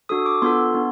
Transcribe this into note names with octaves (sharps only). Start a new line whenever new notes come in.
D4 F#4 A4 D#6
D6
B3 D4 F4 A4 C6
B3 D4